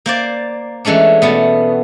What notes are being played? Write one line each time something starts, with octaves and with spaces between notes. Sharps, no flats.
A#3 C5 D5
E3 G#3 A3 C#4 D4
B2 A3 B3